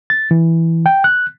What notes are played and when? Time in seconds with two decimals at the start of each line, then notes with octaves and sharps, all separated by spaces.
0.10 A6
0.31 E3
0.86 G5
1.04 F#6